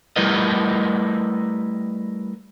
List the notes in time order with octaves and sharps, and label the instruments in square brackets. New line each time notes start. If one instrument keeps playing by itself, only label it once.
[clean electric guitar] G3 A3 E4 A#4 B4 D#5